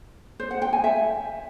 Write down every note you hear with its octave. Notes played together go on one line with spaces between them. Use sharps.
C5
F#5
G5
G#5
E5